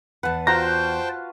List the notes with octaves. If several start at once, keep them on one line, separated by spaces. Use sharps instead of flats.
E2 B4 F#5 A5
F4 F#4 C5 F5 G5 A5 A#5